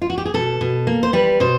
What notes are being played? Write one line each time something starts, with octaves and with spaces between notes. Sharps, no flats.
F4
F#4
G4
G#4
B2 A4
B2
A#3
C5
G3 B4
B2 C5